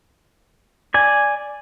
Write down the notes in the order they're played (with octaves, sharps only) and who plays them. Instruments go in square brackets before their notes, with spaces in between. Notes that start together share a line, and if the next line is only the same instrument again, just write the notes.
[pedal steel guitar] D5 G#5